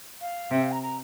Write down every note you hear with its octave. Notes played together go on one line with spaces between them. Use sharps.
F5
C3 E5
F5
A#5
A#5